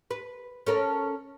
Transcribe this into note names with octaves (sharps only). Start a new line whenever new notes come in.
B4
C#4 A4 A#4